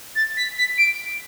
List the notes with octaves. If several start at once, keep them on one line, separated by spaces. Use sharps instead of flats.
A6
B6
B6
D7